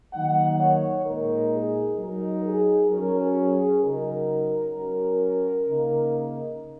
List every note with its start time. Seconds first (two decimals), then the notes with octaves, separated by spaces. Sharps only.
0.13 D#3 F#3 A#3 D#4 F#5
0.60 C#5
1.06 A#2 G#3 D#4 A#4
1.52 G#4
1.98 F#3 D#4 A#4
2.45 G#4
2.90 F#3 C#4 A#4
3.22 G#4
3.53 G#4
3.83 C#3 F#3 D#4 A#4
4.76 F#3 C#4
5.69 C#3 A#3 D#4